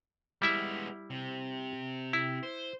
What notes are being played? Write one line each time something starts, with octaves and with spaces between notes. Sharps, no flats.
G3 G#3 B3 E4 E5
C3
E4
C5